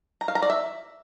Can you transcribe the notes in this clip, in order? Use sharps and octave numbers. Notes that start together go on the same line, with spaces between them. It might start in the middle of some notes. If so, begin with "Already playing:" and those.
A#5
F5
A#5
D5
E5